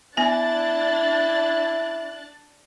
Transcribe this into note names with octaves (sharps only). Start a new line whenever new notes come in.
B3 D4 E4 G#5 F#6 A6